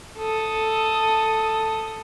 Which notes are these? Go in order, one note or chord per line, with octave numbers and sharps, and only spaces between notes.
A4 D#6